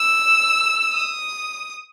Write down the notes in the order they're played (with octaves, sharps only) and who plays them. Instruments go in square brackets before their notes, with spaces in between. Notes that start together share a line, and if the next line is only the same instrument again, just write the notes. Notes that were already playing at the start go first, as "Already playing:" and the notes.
Already playing: [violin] E6
D#6